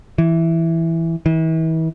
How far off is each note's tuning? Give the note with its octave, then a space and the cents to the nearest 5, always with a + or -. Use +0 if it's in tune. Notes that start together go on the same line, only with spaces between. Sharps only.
E3 +0
E3 -40